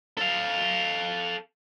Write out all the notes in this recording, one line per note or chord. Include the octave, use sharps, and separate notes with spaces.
A4 F5